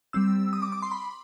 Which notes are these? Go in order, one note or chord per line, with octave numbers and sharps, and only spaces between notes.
G3 C4 E6
D#6
D6
D6
C6
B5